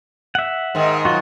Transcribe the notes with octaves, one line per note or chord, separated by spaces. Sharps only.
E5 F#5
G#2 D#3
F#3 F4 F#4